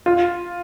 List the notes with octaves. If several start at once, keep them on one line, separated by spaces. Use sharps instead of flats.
F4